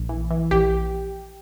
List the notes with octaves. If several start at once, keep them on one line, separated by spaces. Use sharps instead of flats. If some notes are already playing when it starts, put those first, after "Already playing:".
Already playing: A#1
E3
E3
A#1 G4